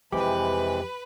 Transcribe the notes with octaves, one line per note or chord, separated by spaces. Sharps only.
F2 C3 E3 G#3 G4 B4 B5